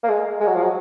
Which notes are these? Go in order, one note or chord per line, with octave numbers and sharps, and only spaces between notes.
A#3
G#3
G#3
F#3
F3
F#3